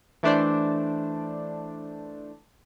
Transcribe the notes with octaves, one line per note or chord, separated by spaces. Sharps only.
E3 A3 D4 C5 D5